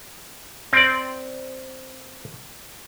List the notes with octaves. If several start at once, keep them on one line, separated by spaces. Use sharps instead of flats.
C4 D5